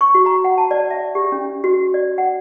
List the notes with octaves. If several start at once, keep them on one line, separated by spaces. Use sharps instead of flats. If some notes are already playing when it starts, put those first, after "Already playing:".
C#6
F#4
A#5
F#5
A5
D5
E5
G4
C#4
F#4
D5
F#5